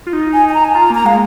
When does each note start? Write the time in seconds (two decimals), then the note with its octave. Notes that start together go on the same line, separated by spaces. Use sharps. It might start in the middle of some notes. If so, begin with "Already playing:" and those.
0.07 F4
0.13 D#4
0.33 G#5
0.49 G#5
0.54 A#5
0.65 G#5
0.74 F4 A#5
0.90 A#3 A#5
1.04 G#3 F5